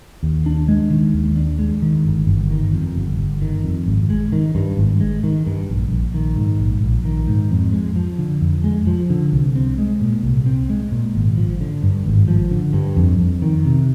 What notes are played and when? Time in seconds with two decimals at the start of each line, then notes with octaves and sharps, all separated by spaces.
0.23 D#2
0.46 D4
0.68 G#3
0.91 D#3
1.14 D#2
1.36 D4
1.59 G#3
1.82 D#3
2.05 G1
2.27 G1
2.51 D#3
2.72 F2
2.96 G1
3.18 G1
3.42 D#3
3.64 F2
3.86 G#1
4.10 G#3
4.32 D#3
4.55 G2
4.77 G#1
5.01 G#3
5.24 D#3
5.47 G2
5.69 A#1
5.91 A#1
6.14 D#3
6.37 G#2
6.60 A#1
6.83 A#1
7.05 D#3
7.27 G#2
7.51 F2
7.73 G#3
7.96 F3
8.19 D3
8.41 F2
8.64 G#3
8.87 F3
9.10 D3
9.32 C2
9.56 C4
9.78 G#3
10.01 A#2
10.23 C2
10.46 C4
10.70 G#3
10.92 A#2
11.15 G#1
11.37 F3
11.61 D3
11.83 G2
12.06 G#1
12.28 F3
12.51 D3
12.73 G2
12.97 F2
13.19 F2
13.42 D#3
13.65 C3